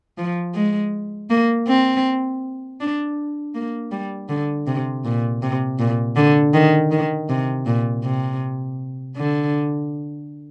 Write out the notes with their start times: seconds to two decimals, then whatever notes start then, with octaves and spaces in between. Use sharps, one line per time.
0.18 F3
0.54 G#3
1.30 A#3
1.68 C4
2.80 D4
3.54 A#3
3.91 G3
4.29 D3
4.67 C3
5.05 A#2
5.42 C3
5.79 A#2
6.16 D3
6.54 D#3
6.91 D#3
7.29 C3
7.66 A#2
8.04 C3
9.16 D3